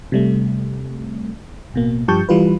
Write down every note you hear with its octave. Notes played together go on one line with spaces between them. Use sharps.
C3 G3 A3
A1 B2 A#3
G2 F3 G4 A5 C#6 G6
E3 G3 F4 B4